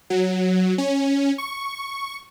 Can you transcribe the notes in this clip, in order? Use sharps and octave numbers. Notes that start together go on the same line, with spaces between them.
F#3
C#4
C#6